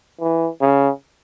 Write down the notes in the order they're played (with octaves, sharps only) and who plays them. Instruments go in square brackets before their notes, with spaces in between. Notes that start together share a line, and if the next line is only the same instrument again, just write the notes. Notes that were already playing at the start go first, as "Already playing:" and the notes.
[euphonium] E3
C#3